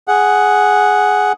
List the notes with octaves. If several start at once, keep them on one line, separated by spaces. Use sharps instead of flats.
G#4 F#5